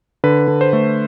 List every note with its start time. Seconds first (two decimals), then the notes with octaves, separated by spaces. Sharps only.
0.24 D3 B4
0.48 D3
0.61 C5
0.73 A3